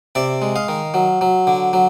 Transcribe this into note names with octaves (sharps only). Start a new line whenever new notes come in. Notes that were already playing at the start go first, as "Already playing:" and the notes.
C3 D5 E5
G#3
D#5 F5
D#3
F#3
F#3
D3
F#3